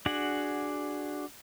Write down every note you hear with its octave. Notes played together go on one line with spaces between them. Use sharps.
D4 F#4 G#4 F#5